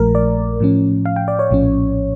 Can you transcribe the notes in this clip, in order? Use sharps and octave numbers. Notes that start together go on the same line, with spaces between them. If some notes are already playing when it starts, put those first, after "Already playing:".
Already playing: A#1 A#2 F3 A3 A#4
D5
A2 F3 C#4
F5
G5
D5
C#5
A#1 A2 F3 C#4